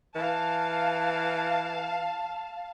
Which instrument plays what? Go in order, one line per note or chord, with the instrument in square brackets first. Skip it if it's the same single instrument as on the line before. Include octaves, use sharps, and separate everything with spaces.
[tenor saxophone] E3 [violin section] F5 A5